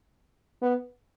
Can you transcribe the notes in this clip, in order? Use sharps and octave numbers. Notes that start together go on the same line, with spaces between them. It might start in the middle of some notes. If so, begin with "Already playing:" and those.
B3